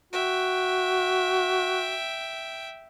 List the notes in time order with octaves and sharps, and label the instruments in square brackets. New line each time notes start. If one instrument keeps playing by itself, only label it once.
[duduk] F#4 [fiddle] E5 G5